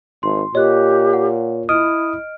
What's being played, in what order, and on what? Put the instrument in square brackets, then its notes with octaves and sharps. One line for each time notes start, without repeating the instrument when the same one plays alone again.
[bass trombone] G#1 [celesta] C6
[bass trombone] A#2 [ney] G4 [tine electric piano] C#5 [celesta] D#5 F#6
[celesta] F#5
[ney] E4 [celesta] D#5 F6 D7 [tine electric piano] D#6